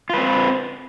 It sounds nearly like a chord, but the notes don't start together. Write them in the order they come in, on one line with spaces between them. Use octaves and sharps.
F4 B4 C4